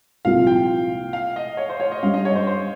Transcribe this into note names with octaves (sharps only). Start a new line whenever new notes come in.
C2 A#2 F3 C4 F5
G5
F5
D#5
C#5
C5
C#5
D#5
G2 G3 C#4 F5
D#5
C#5
C5
C5